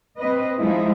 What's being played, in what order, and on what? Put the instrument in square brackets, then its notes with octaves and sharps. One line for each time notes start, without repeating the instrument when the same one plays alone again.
[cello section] C4 B4 D#5
F3 G#3 D#4 E4